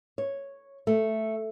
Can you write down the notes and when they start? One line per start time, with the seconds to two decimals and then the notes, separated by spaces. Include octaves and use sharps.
0.18 C#5
0.87 A3